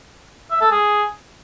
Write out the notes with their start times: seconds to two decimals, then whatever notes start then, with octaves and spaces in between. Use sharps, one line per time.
0.51 E5
0.61 A4
0.71 G#4